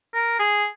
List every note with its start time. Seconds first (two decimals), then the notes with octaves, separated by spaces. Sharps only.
0.14 A#4
0.39 G#4